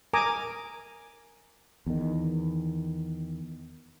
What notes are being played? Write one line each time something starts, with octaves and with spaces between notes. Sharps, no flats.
A#4 G#5 A#5 D6 D#6
E2 D#3